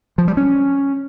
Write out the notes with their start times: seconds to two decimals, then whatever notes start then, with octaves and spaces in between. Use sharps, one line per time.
0.18 F3
0.28 G3
0.37 C#4